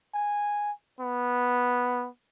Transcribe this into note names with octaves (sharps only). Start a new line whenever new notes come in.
G#5
B3